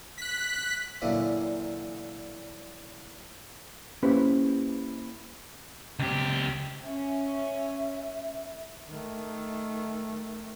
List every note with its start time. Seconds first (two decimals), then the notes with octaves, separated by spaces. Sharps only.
0.18 F#6 B6
1.02 A#2 D3 E3 F#3
4.03 A#3 C#4 E4 G4 B4 C5
5.99 C#2 G4
6.84 C#4 E5
8.88 D#3 A3